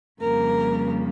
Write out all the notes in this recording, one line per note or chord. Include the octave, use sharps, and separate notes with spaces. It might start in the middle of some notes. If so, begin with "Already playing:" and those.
F2 C#3 G3 A#3 A#4